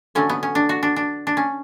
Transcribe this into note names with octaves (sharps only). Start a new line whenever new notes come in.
D3 F#3 A3 C#4
B3
C#4
D4
F#4
D4
D4
D4
C#4